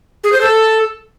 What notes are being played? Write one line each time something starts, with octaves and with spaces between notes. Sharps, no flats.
G#4
C5
A4